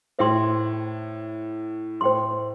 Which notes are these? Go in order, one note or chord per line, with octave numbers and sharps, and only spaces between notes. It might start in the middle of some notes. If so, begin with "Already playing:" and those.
A2 C5 E5 G5 C6
A2 C5 G5 C6